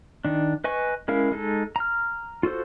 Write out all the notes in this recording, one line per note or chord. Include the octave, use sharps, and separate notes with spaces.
D#3 D4
B4 D#5 G#5 C#6
G#3 C#4 E4 A#4 F5
G#3 D#4 A4
A#5 F6
F4 F#4 A4 C5